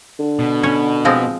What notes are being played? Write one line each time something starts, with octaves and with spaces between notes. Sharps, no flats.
D3
B2
C#4 C#5
F3 G#3 C4